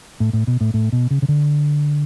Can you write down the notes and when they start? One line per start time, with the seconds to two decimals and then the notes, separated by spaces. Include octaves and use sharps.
0.20 A2
0.33 A2
0.47 B2
0.61 A2
0.74 A2
0.92 B2
1.11 C#3
1.22 C#3
1.28 D3